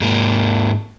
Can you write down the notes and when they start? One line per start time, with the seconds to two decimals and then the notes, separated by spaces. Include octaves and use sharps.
0.01 G#2 A#3